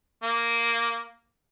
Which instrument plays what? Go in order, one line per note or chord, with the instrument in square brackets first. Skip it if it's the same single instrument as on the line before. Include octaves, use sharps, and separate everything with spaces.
[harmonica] A#3